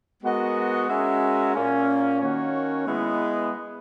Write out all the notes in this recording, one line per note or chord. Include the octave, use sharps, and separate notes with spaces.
G#3 B3 F#4 A#4 D#5
G#3 C#4 F#4 A#4 E5
A#2 A#3 C#4
D#3 A#3 C#4 F#4 C#5
G#3 B3 E4 B4 D#5